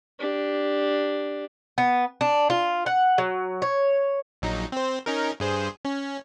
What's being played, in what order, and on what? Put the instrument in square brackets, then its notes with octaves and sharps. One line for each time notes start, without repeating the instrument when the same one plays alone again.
[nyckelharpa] D4 G4
[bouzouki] B3
D4
F4
F#5
F#3
C#5
[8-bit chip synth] A#1 F#3 D#4
C4 C5
C#4 D#4 A#4
G2 G#4 C5
C#4